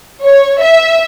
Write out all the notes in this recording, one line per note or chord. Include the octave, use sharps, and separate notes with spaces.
C#5
E5